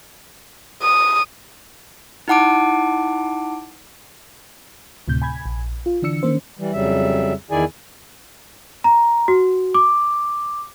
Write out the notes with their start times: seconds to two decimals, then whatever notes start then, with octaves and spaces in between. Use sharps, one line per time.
0.82 D#6
2.28 D#4 E4 F#5 A5 D6 D7
5.08 D2 A2 C3 G6
5.22 G#5 B5 G#6
5.46 A#1
5.86 F4
6.02 D3 E3 D4 E6 C#7
6.23 D#3 A#3 C#4 C5
6.59 E3 G3
6.73 F2 C#3 F#3 G3 E5
7.51 E2 D#3 E4 G#4 D5 G#5
8.84 A#5
9.28 F#4
9.74 D6